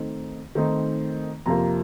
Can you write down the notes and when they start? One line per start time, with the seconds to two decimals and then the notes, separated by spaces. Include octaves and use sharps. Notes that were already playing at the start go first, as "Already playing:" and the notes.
Already playing: D#3 A3 C4 D#4
0.55 D#3 A3 C4 D#4
1.46 F2 C3 F3 A#3 A#5